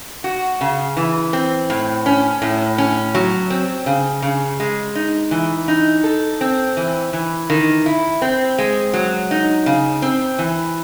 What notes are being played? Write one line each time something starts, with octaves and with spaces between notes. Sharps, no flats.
F#4
C#3
E3
C4
A2
C#4
A2
C#4
F#3
C4
C#3
C#3
G#3
D#4
E3
D#4
A4
C4
E3
E3
D#3
E4
C4
G#3
F#3
D#4
C#3
C4
E3